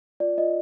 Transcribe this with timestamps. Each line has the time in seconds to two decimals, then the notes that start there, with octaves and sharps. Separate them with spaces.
0.20 F4 D5
0.38 F4 D#5